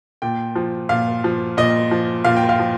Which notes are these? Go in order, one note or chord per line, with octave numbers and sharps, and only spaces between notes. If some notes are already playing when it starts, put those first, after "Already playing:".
A#2 G5
F3
A#2 F5
F3
A#2 D#5
F3
A#2 F5
G5
F5
F3